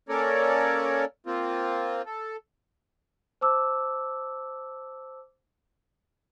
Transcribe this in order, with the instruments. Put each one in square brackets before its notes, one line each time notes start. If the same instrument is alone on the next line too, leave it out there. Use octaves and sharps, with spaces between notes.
[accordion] A#3 C#4 A4 A#4 C#5 D5
A#3 C4 F4
A4
[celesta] C5 A5 D6 E6